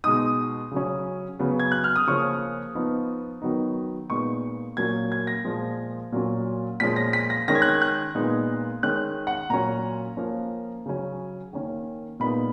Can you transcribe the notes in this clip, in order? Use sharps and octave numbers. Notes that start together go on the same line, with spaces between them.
B2 G#3 D#4 D#6
C#3 F#3 C#4
C#3 F#3 B3
G#6
F#6
F6
D#6
C#3 F3 A#3 C#4 C#6
F3 B3 D#4
D#3 F#3 B3 D#4
A#2 G#3 B3 D#4 C#6
A#2 F#3 A#3 C#4 G#6
G#6
A#6
A#2 F3 G#3
A#2 F#3 C#4
A#2 F3 G#3 C#4 B6
A#6
B6
A#6
D#3 G#3 C#4 A#6
G#6
F#6
G#6
F#6
A#2 G#3 B3 D#4
D#3 G#3 C#4 F#6
F#5
A#2 F#3 C#4 A#5
F3 A#3 C#4
C#3 F#3 C#4
D#3 A#3 C#4
A#2 G#3 B3 D#4 B5